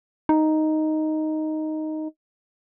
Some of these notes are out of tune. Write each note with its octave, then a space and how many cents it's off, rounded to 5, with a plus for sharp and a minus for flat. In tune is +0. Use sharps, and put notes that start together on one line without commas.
D#4 +0